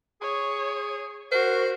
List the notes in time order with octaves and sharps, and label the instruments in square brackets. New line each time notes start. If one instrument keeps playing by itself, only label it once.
[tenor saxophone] G#4 [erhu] C#5
[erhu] F#4 [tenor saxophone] A#4 [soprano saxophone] C5